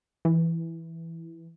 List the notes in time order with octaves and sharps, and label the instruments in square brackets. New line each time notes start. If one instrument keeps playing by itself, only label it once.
[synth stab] E3